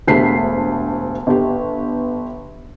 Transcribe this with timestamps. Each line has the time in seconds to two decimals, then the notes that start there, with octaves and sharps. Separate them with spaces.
0.07 E1 D2 A3 G4 B6 C7
1.27 G1 G4